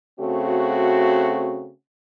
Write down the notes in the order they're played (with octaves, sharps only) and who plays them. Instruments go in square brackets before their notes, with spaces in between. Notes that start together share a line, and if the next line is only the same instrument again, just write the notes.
[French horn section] C#3 A3 C4 F#4